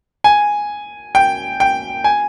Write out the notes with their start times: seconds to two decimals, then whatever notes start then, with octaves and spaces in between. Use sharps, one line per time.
0.24 G#5
1.15 G5
1.60 G5
2.04 G#5